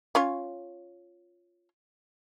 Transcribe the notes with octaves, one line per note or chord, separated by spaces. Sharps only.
C#4 F4 C#5